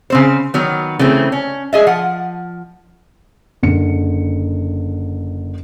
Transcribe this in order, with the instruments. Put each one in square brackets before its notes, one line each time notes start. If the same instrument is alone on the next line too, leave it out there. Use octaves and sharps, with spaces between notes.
[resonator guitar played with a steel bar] C#3 C4 C5
D#3 F#3 B3
C#3 E3 A3 C4
C#4
G#4 D#5 E5
F3 F#5
[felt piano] F#1 D3 C#7